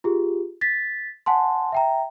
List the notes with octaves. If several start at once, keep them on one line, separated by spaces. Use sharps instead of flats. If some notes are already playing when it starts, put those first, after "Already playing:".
F4 G4 G#4
A6 B6
F#5 G#5 A5 C6
E5 G5 A#5